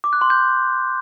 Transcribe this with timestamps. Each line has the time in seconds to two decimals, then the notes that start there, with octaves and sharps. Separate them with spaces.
0.04 D6
0.13 F#6
0.21 C6
0.30 G6